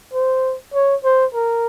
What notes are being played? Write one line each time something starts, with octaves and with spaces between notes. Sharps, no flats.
C5
C#5
C5
A#4